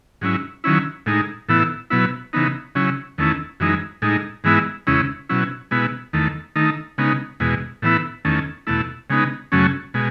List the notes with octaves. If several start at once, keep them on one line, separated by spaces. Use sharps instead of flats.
G#2 F#3 C#4 E4
D#3 F#3 C#4 E4
A2 G#3 D#4
A2 E3 B3 E4
B2 F#3 B3 E4
C#3 E3 B3 D#4
C#3 F#3 C#4 E4
E2 D#3 A3 C#4 E4
F#2 E3 G#3 D#4
A2 G#3 D#4
G#2 E3 G#3 B3 E4
E2 C#3 G#3 C#4 E4
B2 F#3 C#4 E4
B2 G#3 B3 E4
E2 D#3 A3
D#3 A3 D#4
C#3 G#3 B3 D#4
E2 B2 G#3
A2 E3 B3 E4
E2 D#3 A3 C#4
E2 B2 A3 E4
C#3 G#3 B3 D#4
F#2 C#3 F#3 A3 C#4
B2 G#3